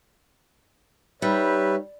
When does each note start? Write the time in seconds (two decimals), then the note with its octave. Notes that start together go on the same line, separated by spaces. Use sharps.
1.22 G3 D#4 B4 C#5 E5